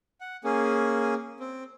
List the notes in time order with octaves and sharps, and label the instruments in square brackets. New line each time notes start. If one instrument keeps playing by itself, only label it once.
[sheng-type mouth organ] F#5
A#3 C#4 G#4
C4